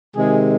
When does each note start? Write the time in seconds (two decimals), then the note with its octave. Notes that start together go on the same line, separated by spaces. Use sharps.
0.15 C3 D#3 G#3 G#4